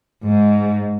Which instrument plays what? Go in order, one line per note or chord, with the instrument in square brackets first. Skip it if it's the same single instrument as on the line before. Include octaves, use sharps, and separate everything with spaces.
[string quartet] G#2